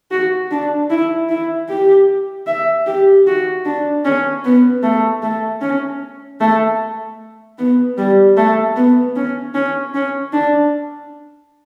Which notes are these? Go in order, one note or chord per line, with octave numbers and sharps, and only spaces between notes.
F#4
D4
E4
E4
G4
E5
G4
F#4
D4
C#4
B3
A3
A3
C#4
A3
B3
G3
A3
B3
C#4
C#4
C#4
D4